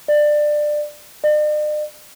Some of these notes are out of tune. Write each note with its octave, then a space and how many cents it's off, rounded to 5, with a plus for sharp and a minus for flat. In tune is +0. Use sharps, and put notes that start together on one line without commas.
D5 +20
D5 +45